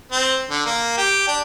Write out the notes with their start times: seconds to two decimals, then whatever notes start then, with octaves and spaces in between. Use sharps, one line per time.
0.12 C4
0.50 D3
0.65 A#3
0.97 G4
1.28 D4